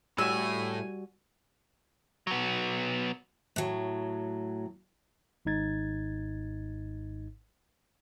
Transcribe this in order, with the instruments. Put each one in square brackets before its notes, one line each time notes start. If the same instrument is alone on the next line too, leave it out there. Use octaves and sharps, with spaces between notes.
[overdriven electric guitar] A2 [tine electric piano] G3 F#4 [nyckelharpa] G#5 [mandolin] E6
[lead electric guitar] F#3 B3
[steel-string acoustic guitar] A2 F#3
[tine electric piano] G#1 G#2 D#4 G#6 A6